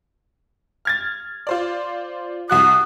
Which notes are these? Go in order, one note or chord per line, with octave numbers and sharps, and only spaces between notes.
F6 G#6 A6
F4 C5 D5
C2 F#4 D#6 F#6